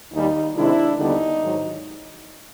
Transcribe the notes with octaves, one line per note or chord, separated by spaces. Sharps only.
D#2 D#3 G3 D#4
C3 D#3 G#3 D4 E4
D#2 D3 G3 B3 D4 D#4
G#2 D#3 F#3